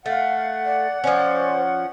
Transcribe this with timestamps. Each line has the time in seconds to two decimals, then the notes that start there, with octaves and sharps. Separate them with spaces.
0.06 A3 F5 F#5
0.65 D5
1.04 F3 C#4 C5 D5